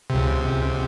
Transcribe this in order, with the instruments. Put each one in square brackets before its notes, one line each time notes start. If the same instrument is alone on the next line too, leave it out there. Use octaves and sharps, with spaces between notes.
[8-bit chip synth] C#2 C3